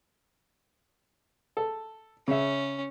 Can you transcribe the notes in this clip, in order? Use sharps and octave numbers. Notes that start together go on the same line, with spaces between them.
A4
C#3 C#4 E5